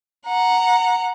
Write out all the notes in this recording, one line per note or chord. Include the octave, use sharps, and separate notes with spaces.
F#5 A#5